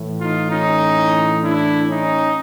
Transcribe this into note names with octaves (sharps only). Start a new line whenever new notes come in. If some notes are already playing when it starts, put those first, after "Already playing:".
Already playing: A2 E3
D#4 F4
C#4 D#4
D4 E4
C#4 D#4